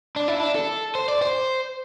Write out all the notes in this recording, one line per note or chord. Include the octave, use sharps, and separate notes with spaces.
D4
E4
D4
A4
C5
D5
C5